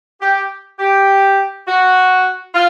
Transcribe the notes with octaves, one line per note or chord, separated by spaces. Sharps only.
G4
G4
F#4
F4